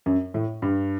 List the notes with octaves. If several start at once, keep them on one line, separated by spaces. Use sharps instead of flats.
F#2
A2
G2